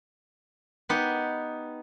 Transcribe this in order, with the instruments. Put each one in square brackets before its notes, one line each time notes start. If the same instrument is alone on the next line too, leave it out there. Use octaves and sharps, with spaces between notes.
[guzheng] B3 D#4 G4 F#5